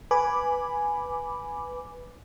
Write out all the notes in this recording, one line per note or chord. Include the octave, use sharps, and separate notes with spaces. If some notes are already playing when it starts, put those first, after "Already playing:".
B4 G#5 B5 D6